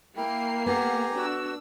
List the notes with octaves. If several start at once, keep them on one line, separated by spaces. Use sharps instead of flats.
A#3 E4 G5 C7
B3 G4 A4 F#5 G#5 A#5
D4 F#4 E6